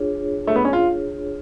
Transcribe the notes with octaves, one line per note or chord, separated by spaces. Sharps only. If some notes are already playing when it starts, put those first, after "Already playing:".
Already playing: D4 F4 G#4 C#5
A3
B3
C#4
F4